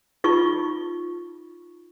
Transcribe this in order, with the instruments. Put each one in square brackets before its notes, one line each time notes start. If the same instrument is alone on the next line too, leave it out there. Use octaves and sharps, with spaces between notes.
[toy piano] D#4 F4 C#6